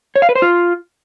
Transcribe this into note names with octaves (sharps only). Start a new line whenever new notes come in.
C#5
F5
B4
C5
F4